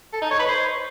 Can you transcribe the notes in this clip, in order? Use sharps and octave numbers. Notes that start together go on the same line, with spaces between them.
A4
D#4
C#5
B4
C5